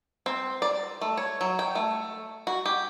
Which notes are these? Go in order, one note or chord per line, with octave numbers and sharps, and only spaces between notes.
C4
D5
A3
C#5
F#3
G5
A3
F#4
G4